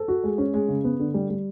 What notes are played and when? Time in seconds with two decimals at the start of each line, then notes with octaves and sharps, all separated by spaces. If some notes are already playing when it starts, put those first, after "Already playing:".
Already playing: A4
0.08 F#4
0.24 G#3
0.38 C#4
0.54 G#3
0.68 C#3
0.84 B3
0.99 D3
1.14 G3
1.30 G3